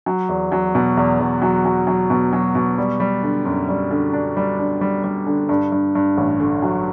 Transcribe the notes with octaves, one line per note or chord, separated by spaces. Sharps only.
F#3
E2
F#3
B2
E2
E2
F#3
F#3
F#3
B2
F#3
B2
G3
G3
D3
F#2
G3
D3
D4
G3
D4
G3
G3
D3
G2
G2
G2
A1
D3
F#3